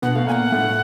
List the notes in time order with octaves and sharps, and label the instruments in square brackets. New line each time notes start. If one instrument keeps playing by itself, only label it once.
[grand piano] B2 B3 [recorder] F#5
[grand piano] A3 [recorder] F5
[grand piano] A#2 A#3 [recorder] G#5
[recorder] F#5
[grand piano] A2 A3